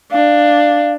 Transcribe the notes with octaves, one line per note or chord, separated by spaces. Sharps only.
D4 F5